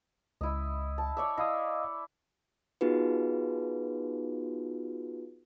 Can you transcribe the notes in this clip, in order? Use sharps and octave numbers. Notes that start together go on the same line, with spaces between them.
C#2 E4 D#5
A5
C#5 D5 E5
E4 D#5 F5 D#6
B3 D#4 F4 F#4 G#4 B4